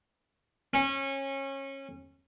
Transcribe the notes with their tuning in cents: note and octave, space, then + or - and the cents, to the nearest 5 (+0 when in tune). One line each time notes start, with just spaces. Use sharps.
C#4 -25